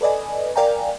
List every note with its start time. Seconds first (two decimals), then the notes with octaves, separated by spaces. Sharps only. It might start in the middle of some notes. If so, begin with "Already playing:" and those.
0.01 A4 B4 D5 D#5 G#5
0.56 A#4 D5 F5 G5 G#5 A#5